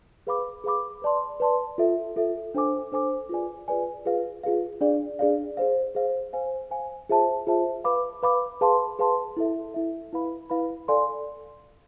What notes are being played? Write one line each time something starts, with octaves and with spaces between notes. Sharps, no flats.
G#4 B4 F5 B5 D6
G#4 B4 F5 B5 D6
B4 D5 A5 C6
B4 D5 A5 C6
F4 A4 E5
F4 A4 E5
D4 A4 C5 G#5 D6
D4 A4 C5 G#5 D6
F4 G#4 B4 D5 G#5
F4 G#4 B4 D5 G#5
F4 G#4 B4 F5
F4 G#4 B4 F5
D4 G#4 D5 F5
D4 G#4 D5 F5
G#4 C5 F5
G#4 C5 F5
C5 F5 G#5
C5 F5 G#5
F4 G#4 C5 E5 A5
F4 G#4 C5 E5 A5
B4 F5 B5 D6
B4 F5 B5 D6
G#4 B4 F5 A5 C6
G#4 B4 F5 A5 C6
E4 A4 E5
E4 A4 E5
E4 B4 F5 B5
E4 B4 F5 B5
A4 D5 F5 G#5 C6